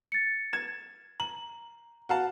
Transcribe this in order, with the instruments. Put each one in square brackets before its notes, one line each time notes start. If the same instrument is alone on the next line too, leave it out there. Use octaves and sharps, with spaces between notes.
[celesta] A6 C#7
[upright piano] G#6 E7
[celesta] A#5 [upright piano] F#7
[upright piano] F#4 F5 A5